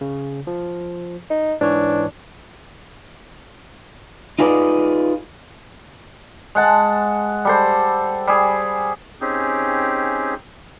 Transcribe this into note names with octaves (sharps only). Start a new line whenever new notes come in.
C#3
F3
D#4
G#2 E3 D4 C#5
D#4 F4 G#4 B4 D5
G#3 F#5 A5
G3 A4 C5
G3 G#4
C4 C#4 D#4 G4 G#4